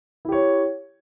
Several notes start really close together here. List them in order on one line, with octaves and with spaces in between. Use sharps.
E4 G4 C#5